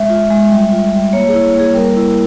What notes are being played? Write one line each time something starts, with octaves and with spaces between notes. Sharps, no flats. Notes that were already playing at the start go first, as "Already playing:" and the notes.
Already playing: G#3 E5
F4
G#3
G3
F4
G3
A#3 C#5
G#4
E4
G#4
A#3
G#4
G3 A#4
E4